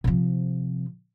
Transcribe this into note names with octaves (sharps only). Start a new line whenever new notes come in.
C3 F3